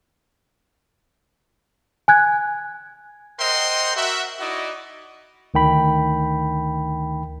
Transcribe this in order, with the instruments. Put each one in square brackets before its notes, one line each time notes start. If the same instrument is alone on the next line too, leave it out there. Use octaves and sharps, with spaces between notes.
[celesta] G#5 F#6 G#6
[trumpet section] A#4 C5 D#5 F#5 G5 C6
F#4 A#4 E5
D#4 E4 F#4 D5 D#5
[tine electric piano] D2 D#3 G5 B5